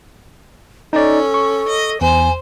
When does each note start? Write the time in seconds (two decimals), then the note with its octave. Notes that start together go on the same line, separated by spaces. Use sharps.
0.93 C#4 D#4 A4 D5
1.34 C#6
1.68 D#5
2.01 E2 C5 G#5